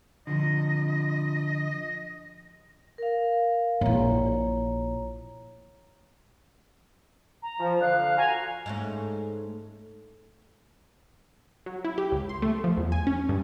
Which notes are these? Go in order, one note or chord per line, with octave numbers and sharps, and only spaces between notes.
D3 F3 D#5
A#4 F5
A#1 E4 C#5 A#5
A#5
F3
D3 F5 F#6
F4 F#4 G#5 A#5
G#2 A3 C#4
F#3
E4
G4
C#2
C6
A3
F3
E2
G#5
C#4
G2